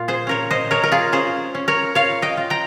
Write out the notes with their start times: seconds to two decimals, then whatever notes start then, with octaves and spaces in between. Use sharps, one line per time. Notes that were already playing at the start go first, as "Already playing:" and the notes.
Already playing: A#2 F4
0.08 G#4 C5
0.27 C#4 A#4 C#5
0.50 C5 D#5
0.71 G#3 A#4 C#5
0.83 A#4
0.92 F4 G#4
1.12 C#4 G#4 C5
1.55 C#4
1.68 A#4 C#5
1.95 F4 C#5 F5
2.22 D#5 G5
2.37 F4
2.50 G5 A#5